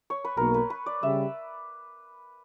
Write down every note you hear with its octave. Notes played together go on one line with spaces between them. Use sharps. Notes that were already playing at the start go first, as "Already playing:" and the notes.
C#5
B4
B1 B2 A#3 A#4
B4
B4
D5
C#3 G3 E5